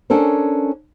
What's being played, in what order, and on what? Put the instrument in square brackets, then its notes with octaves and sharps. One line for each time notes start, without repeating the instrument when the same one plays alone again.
[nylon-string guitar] C#4 D4 A4 A#4 C5